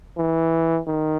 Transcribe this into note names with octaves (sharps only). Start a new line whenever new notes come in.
E3
D#3